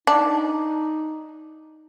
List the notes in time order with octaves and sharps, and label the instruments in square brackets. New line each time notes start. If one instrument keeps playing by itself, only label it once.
[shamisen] D4 [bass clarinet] D#4